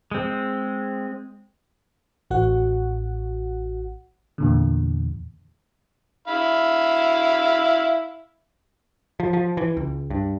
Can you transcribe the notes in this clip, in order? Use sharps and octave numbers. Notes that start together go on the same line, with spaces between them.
G#3 C4
A1 F#4 F#5
E2 A#2 D3
E4 F5 B5
F3
F3
E3
C#2
G2